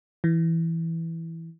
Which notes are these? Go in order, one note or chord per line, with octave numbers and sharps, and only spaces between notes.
E3